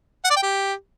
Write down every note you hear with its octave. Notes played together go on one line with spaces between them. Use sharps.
F#5
D5
G5
G4